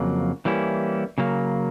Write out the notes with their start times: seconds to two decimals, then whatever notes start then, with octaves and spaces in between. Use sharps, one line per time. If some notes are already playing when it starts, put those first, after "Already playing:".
Already playing: F2 C#3 F#3 A#3
0.45 E3 G3 A#3 C#4 E4
1.18 C#3 F#3 A#3